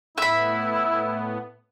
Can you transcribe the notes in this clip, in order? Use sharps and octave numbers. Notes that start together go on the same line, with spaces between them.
A2 B3 E4 E5 B5